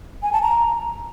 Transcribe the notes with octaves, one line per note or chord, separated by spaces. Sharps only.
G#5
A5
A#5